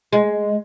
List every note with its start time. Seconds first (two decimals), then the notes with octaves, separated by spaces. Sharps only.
0.13 G#3